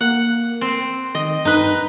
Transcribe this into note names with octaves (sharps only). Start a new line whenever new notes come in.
A#3 F#5
C4
D#3 D#5
G2 D#4 B4